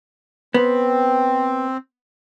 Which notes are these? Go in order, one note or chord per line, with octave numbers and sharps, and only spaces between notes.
B3 C4